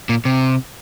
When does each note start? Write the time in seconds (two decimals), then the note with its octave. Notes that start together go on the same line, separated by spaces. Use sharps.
0.09 A#2
0.25 C3